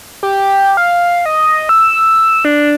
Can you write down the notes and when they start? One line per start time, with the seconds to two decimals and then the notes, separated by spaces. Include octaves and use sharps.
0.23 G4
0.77 F5
1.26 D#5
1.69 E6
2.45 D4